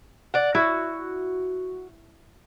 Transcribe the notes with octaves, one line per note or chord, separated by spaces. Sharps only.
D5 F#5
E4 F#4